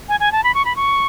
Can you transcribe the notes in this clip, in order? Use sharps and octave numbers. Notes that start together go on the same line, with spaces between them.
G#5
G#5
A5
B5
C#6
B5
C#6